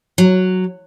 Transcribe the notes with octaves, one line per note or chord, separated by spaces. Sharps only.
F#3